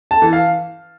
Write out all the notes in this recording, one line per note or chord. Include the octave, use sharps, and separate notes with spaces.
A5
E3
F5